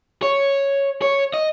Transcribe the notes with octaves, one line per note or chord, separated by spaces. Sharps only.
C#5
C#5
D#5